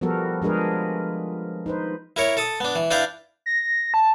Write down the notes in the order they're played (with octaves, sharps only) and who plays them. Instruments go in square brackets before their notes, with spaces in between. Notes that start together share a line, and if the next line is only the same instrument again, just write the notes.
[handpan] F3 G3 B3 F#4 A4 A#4
F3 G#3 D4 G#4 A#4 B4
D#4 B4 C5
[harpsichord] E4 A#4 C#5
A4 A5 D#6
B3 D4
E3
D4 E4 B4 D5 F5 G5
[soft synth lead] A#6
A5